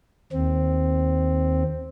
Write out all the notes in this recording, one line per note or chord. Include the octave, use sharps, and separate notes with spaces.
D#2 C4